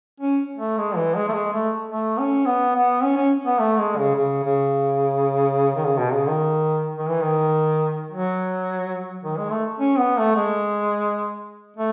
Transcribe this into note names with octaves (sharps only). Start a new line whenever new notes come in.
C#4
A3
G#3
E3
G#3
A3
G#3
A3
A3
C#4
B3
B3
C#4
C#4
B3
A3
G#3
C#3
C#3
C#3
D#3
C#3
B2
C#3
D#3
D#3
E3
D#3
F#3
D#3
G#3
A3
C#4
B3
A3
G#3
A3